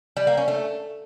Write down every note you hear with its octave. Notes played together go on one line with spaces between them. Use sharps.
G3
A#3
C#4
A3